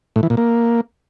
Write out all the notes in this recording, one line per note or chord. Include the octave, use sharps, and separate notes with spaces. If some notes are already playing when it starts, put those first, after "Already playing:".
A2
E3
A#2
A#3